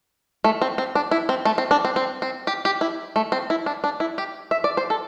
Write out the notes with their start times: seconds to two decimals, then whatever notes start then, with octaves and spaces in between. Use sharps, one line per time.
0.44 A3
0.62 C4
0.78 C4
0.95 D4
1.11 E4
1.29 C4
1.45 A3
1.58 C4
1.71 D4
1.85 C4
1.96 C4
2.22 C4
2.47 G4
2.65 G4
2.81 E4
3.16 A3
3.32 C4
3.50 E4
3.66 D4
3.84 D4
4.00 E4
4.18 G4
4.51 E5
4.64 D5
4.77 C5
4.90 A4